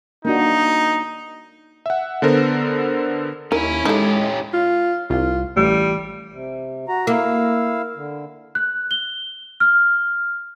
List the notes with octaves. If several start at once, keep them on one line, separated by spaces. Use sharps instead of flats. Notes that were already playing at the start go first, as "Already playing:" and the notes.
A#3 D4 D#4 F#4
E5 F#5
D3 B3 A4 A#4 C5
D#2 C#4 E4 A#4
G#3 C#4 D#4 G4 A4
F4
C2 F4
A1 G3
C3
F#4 A#5
A#3 E4 F5 E6
D3
F#6
G7
F6